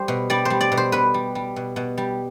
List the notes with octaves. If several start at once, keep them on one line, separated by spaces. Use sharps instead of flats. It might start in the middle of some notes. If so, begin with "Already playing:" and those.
Already playing: G3 C5
B2
G3 D5
G3 C5
D5
B2
C5
B2 B4
G3
G3
B2
B2
G3